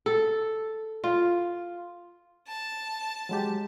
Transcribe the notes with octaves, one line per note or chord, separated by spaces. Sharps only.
A4
F4
A5
F#3 G#3 G4